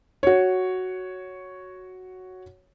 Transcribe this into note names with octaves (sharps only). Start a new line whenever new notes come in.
F#4 C#5